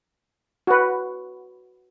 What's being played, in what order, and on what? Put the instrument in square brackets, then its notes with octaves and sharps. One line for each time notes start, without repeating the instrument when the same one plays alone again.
[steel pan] F#4 B4